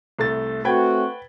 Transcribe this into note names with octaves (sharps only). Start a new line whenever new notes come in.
C2 A3 A6
A3 C4 F#4 B4 G5 G#6